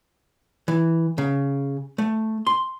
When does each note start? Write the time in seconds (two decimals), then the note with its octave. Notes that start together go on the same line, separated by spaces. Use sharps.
0.68 E3
1.18 C#3
1.98 A3
2.47 C6